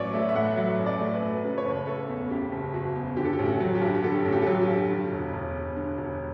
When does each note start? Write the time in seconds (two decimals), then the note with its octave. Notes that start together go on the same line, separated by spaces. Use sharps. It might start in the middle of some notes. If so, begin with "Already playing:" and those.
Already playing: A1 F#3 B4 C#5 D5
0.14 A3 E5
0.29 E5
0.35 A2 F#5
0.56 F#3 E5
0.79 A1
0.86 D5
1.00 A3
1.15 B4
1.22 A2
1.44 C#3 B4
1.58 C#5
1.65 F#1
1.70 B4
1.87 F#1 A4
2.08 E2
2.30 C#3 G4
2.52 F#1
2.74 F#1 F#4
2.95 E2
3.16 D3 G4
3.25 A4
3.33 G4
3.39 A1
3.46 F#4
3.60 F#3
3.75 G4
3.81 G2 F#4
3.95 G4
4.03 D3 A4
4.25 A1
4.32 G4
4.42 A4
4.46 F#3 G4
4.62 G4
4.68 G2
4.90 D3
5.12 E1
5.33 E1
5.55 E2
5.77 D3
5.98 E1